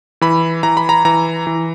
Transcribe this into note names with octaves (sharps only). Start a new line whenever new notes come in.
E3 B5
E3 A#5
B5
A#5
E3 A#5
E3